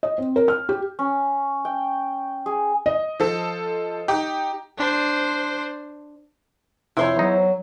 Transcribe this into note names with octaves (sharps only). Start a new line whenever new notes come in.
D#5
C4
A#4
F6
G4
C#4
G5
G#4
D#5
F3 A4
D#4 G4
D4 C5
F2 C3 E4 C5 C#5
E2 F#3 D#4